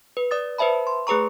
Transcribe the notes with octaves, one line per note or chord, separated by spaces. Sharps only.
B4
D5 D#6 A6
B4 C5 E5 A5 B5
C6
A3 G#4 B4 A#5 C#6